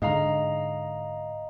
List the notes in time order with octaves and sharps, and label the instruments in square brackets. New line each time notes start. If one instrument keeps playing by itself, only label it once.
[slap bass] G#2 D3 [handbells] D#5 F5 A#5